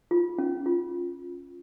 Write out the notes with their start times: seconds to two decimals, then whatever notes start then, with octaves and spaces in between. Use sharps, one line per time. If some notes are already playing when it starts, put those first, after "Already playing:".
0.11 F4
0.38 C#4
0.66 F4